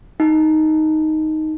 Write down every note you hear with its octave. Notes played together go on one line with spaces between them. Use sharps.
D#4